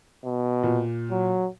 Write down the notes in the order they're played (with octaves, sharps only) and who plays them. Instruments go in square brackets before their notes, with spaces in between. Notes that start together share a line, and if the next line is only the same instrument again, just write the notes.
[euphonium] B2
[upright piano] A#2
[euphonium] F#3